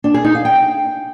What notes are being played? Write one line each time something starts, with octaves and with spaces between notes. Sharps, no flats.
D4
G#4
D#4
F5
G5